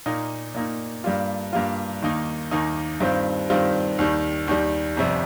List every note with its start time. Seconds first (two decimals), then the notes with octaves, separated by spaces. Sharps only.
0.06 A#2 A#3 D#4
0.54 A#2 A#3 D#4
1.04 G2 G3 A#3 F4
1.53 G2 G3 A#3 F4
2.02 D#2 D#3 A#3 D#4
2.51 D#2 D#3 A#3 D#4
3.00 G2 D#3 G3 C4 F4
3.50 G2 D#3 G3 C4 F4
3.99 D#2 D#3 G3
4.48 D#2 D#3 G3
4.97 G1 F2 C3 G3